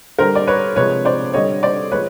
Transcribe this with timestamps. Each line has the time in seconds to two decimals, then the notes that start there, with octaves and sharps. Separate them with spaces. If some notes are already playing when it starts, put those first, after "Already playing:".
0.18 D3 G3 A#4 C5
0.35 D5
0.47 B4 C#5
0.76 C3 F3 G#3 B4 C#5
1.05 C5 D5
1.33 D3 G3 C#5 D#5
1.63 C5 D5
1.92 F3 G#3 B4 C#5